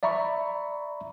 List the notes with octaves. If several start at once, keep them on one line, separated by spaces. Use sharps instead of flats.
D5 E5 A#5 B5 C#6